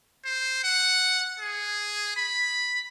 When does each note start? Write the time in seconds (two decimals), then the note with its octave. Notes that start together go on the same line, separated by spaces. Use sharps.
0.25 C5
0.64 F#5
1.39 G#4
2.16 B5